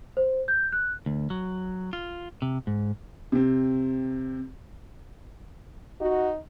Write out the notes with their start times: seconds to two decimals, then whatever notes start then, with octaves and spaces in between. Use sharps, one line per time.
0.17 C5
0.48 G6
0.72 F#6
1.06 D2
1.30 F#3
1.93 F4
2.42 C3
2.67 G#2
3.32 C3 C4
6.01 D#4 F#4